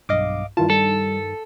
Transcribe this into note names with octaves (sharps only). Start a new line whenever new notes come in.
B1 G2 D#5 F5 D6
G2 D#3 E4 F4 A5
G3 A4